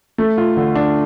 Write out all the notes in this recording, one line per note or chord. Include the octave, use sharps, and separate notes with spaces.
A3
F4
D3
D4